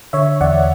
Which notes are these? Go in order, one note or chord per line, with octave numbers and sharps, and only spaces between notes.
D3 C#5 E5
E2 D5 F#5